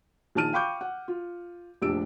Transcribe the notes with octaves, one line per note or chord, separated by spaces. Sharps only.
A#1 D#3 A5 F6 D#7
F5 G5 B5 C#6 D6 G6
F#5
F4
F1 A#1 D4 G4 E6 D7